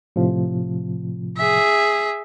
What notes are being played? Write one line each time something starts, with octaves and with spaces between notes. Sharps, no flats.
A2 C3 F3
G#4 E5